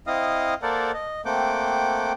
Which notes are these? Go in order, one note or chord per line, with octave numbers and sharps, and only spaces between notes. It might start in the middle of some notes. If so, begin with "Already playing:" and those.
C4 E4 D#5 F5 D#6
A#3 A4 A#4 C5 D5 F#5
D#5
A3 A#3 C4 F#5 G5 D6